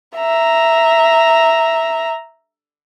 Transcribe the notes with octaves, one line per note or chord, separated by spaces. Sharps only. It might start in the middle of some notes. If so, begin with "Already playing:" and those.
E5 A#5